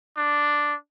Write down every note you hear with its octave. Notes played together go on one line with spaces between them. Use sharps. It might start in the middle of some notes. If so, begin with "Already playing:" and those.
D4